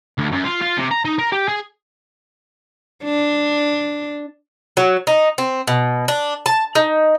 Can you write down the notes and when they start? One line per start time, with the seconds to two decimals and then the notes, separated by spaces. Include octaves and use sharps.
0.18 D2
0.32 F#2
0.45 F4
0.62 F4
0.78 C3
0.91 A#5
1.05 D#4
1.19 A#4
1.32 G4
1.48 G#4
3.04 D4
4.77 F#3
5.07 D#4
5.38 C4
5.67 B2
6.08 D4
6.46 A5
6.75 D#4